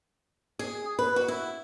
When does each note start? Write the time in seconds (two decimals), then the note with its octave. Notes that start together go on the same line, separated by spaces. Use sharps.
0.59 G#4
0.99 B4
1.16 F#4
1.28 E4